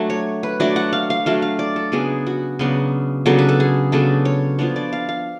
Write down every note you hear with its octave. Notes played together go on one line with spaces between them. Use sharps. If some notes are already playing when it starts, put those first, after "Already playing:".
Already playing: F#3 A3 D4
C#5
B4
F#3 A3 D4 D5
F#5
F5
F5
F#3 A3 D4 F5
F5
D5
A4
C#3 F#3 B3 D4 G#4
F#4
C#3 F#3 B3 D4
C#3 F#3 B3 D4 A4
B4
A4
G#4
C#3 F#3 B3 D4 A4
C#5
F3 B3 D4 C#5
D5
F5
F5